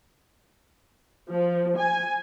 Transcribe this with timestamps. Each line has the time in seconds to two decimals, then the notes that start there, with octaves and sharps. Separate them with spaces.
1.30 F3
1.78 G#5